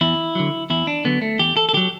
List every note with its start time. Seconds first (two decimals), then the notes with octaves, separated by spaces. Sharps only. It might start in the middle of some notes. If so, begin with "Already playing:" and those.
0.01 E2 E4
0.35 D3 F#3
0.70 E2 E4
0.87 D4
1.05 D3 F#3 B3
1.22 A3
1.39 E2 G4
1.57 A4
1.69 A4
1.73 D3 F#3 G4